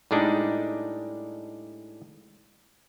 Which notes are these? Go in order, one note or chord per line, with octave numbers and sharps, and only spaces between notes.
A2 G3 G#3 D4 D#4